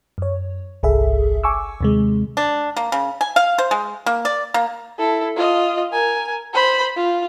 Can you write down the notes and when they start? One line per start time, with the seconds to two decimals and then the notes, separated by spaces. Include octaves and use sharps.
0.18 F#2 C#5
0.83 G1 C2 G#4 A4 E5
1.44 G#5 C#6 D6 E6
1.81 D#2 C3 G#3
2.37 D4
2.77 A#3
2.92 C#3
3.21 G#5
3.36 F5
3.58 C5
3.71 G#3
4.06 A#3
4.25 D5
4.54 A#3
4.98 E4 A4
5.36 F4 D#5
5.92 A#4 G#5
6.53 C5 B5
6.96 F4